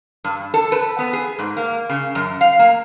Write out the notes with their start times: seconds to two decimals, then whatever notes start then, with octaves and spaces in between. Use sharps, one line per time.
0.24 G2
0.54 A4
0.72 B4
0.99 B3
1.13 G#4
1.39 G#2
1.57 A#3
1.89 C#3
2.15 F#2
2.41 F5
2.59 A#3